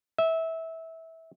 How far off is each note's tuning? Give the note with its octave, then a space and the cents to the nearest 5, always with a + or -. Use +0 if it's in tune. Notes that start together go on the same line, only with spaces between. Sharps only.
E5 -20